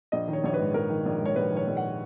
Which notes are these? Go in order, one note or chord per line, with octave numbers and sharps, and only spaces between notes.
A#1 D#5
D#3
C#5
A#1 C#5
B4
G#2
A#1 A#4
D#3
A#1
G#2 C#5
A#1 B4
D#3 C#5
A#1
F#5